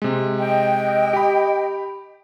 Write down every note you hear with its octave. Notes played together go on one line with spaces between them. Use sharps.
C3 G#3
D#5 G5
G4 B5